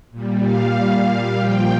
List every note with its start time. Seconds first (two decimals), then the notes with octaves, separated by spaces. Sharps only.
0.11 A#2 G3
0.43 F5
0.74 A#2 G3
1.36 A#2 F3 G5